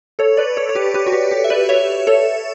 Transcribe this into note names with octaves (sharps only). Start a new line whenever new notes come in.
A4 C#5
B4 D5
A4 C#5
C#5
G4 B4
G4 B4
F#4
G4
G4
E5
B4 D5
C#5 E5
A4 C#5